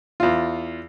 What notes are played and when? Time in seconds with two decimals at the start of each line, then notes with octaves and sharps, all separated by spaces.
0.20 E2 F4